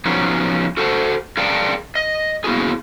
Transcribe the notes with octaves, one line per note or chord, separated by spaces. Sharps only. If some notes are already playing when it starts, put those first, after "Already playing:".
F3 F#3 B3 C#4 D#4 F#4
F#4 A4 C5 F#5 A5
G#4 A#4 D5 F5 G5 A5
D#5
A#3 B3 E4 F#4 G#4